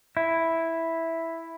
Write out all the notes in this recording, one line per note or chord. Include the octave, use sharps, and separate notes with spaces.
E4